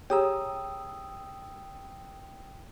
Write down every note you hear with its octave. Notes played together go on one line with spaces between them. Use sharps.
G4 G#4 C#5 G5 A#5 D#6 E6